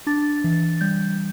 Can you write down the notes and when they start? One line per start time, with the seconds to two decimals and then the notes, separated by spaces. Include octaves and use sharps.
0.07 D4 A6
0.44 E3
0.81 G3 G6